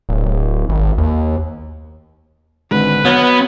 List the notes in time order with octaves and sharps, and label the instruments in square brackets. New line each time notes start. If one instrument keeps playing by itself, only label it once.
[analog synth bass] D1
D1
G#1
D#2
[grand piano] G#1 D3 G#3 [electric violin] B4
[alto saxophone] F#3 [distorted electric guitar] B3 [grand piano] F6